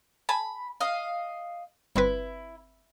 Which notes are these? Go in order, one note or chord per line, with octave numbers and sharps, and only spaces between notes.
G#5 A5 B5
D#5 F5
G1 C4 E4 B4